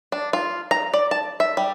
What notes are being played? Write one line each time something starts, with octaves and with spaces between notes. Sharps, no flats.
D4
F4
A#5
D5
A5
E5
G3